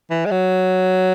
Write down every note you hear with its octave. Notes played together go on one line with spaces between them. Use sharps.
E3
G#3
F#3